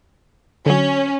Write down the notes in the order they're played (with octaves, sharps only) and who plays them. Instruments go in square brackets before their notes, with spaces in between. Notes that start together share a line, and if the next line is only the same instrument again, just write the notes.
[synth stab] D3 F#3 [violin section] C#4